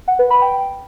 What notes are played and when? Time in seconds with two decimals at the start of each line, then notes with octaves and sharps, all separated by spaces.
0.08 F#5
0.19 B4
0.30 B5
0.42 G5